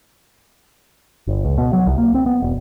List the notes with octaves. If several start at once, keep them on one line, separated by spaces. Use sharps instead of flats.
G1
C#2
B2
F#3
C2
A#3
C4
B3
E1